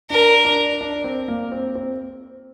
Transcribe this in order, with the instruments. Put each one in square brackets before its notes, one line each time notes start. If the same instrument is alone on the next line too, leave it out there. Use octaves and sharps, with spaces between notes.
[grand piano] D4 [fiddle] A#4
[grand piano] D4
D4
C4
A#3
C4
C4